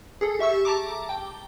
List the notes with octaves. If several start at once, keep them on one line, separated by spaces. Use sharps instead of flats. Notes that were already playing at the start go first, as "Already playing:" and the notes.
G#4 A4
G4 E5 C#6 E6
A5 A#5 D6
G5